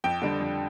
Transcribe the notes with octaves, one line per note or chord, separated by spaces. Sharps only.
F2 G5
D3 G3
F2